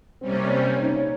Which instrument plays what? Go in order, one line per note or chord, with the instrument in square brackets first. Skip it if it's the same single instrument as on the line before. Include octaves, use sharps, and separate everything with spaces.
[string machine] C3 G3 C#4 [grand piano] C4
[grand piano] A#3
C4
C#4
D#4
C#5